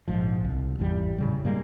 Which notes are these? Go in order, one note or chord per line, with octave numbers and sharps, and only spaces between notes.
A#1 G#2 F3
C2
G#1 E2 G3
A2 C#3 G3
G2 G3 G#3 A#3